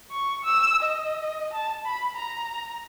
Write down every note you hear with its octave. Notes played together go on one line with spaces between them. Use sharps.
C#6
E6
D#5
A5
B5
A#5